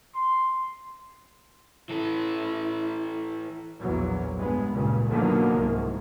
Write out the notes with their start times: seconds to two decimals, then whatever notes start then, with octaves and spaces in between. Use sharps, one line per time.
0.15 C6
1.90 E3 E4 A4
3.79 A#1 E2 F#3
4.37 G2 G#3 B3
4.72 C#2 G2 A#2 C#3
5.09 B2 D3 D#3 F3 F#3 A#3
5.56 C2 G#2